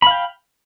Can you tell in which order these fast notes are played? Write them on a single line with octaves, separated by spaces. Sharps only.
B5 F5 G5